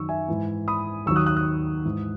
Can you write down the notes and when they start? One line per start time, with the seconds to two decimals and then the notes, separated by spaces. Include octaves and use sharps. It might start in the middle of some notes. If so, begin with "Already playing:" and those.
Already playing: F#2 D#3 F#3 C#6 E6
0.09 E5 G#5
0.28 G#2 E3
0.68 B5 D#6
1.06 D#2 D#3 F#3 C#6 E6
1.16 D#6 F#6
1.26 D#6 F#6
1.36 D#6 F#6
1.84 G#2 E3